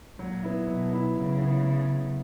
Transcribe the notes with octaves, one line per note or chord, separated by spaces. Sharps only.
A#2 F#3
B3 E4
B2 F#3
B3 E4
C#3 F#3
B3 E4
F#3